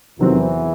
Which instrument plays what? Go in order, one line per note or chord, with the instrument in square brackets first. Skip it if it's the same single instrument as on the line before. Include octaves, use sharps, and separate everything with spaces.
[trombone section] E2 E3 [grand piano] C3 D#3 F#3 C4